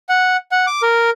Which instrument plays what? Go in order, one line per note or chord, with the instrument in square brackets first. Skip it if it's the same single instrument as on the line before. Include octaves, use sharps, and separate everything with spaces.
[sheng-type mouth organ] F#5
F#5
D6
A#4